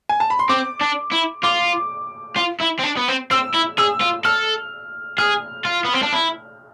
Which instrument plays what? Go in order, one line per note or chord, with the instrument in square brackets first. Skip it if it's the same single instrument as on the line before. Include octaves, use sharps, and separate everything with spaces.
[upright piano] G#5
A5
B5
C6
[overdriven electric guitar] C4 [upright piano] D6
[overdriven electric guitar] D4
E4
[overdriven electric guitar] F4 [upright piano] D6
[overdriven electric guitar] F4
E4
C4
D4
B3
C4
[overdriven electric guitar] C4 [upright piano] E6
[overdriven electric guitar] E4
[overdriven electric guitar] G#4 [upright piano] E6
[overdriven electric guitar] F4
[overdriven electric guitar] A4 [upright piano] F6
[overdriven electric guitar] G#4 [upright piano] F6
[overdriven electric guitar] F4
B3
C4
D4
E4